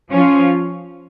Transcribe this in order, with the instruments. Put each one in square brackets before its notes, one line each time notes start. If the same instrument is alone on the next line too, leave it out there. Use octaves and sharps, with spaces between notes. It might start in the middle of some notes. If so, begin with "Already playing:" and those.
[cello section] F3 C#4 F4